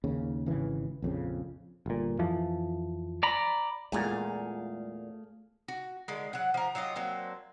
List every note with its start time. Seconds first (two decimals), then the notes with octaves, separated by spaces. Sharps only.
0.04 D#2 C#3
0.46 G#1 C#3 E3
1.02 A#1 F2 C#3
1.86 G1 A#2
2.19 F2 E3 F3
3.23 D5 A#5 B5
3.92 E2 A#2 G#3 A3 G#4 F5
5.68 F#4
6.08 D3 D#3 G#3
6.33 F#3 F#5
6.54 F3 A#4
6.75 F#3 F4 G4 D#5
6.95 F#3 A#3 C4 D4